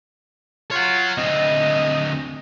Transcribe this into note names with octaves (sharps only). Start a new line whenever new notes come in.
F4 C#5 F#5
D2 C4 D#5